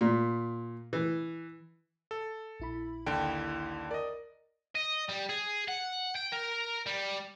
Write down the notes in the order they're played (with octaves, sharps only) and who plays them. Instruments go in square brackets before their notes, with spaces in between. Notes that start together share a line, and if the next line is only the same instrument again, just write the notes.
[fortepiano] A#2
E3
[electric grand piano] A4
[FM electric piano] A#1 E4 B5
[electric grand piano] D#2 D3 G5
[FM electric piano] A#4 [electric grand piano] D5 D#5
[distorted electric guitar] D#5
G3
G#4
F#5
G5
A#4
G3